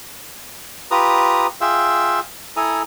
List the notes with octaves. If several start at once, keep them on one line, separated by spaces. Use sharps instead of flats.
F4 G4 B4 A#5 D#6
F4 G#4 E5 F5 G5 E6
E4 A4 G#5 A#5 D#6